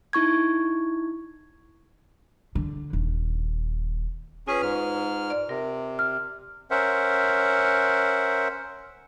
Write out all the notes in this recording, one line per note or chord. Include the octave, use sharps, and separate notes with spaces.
D#4 E4 C#6 G#6
D3
D#1
C#4 F4 G#4 B4 G#5
G#2 F6
D5
C3 A#4
F6
C#4 A#4 C5 E5 F#5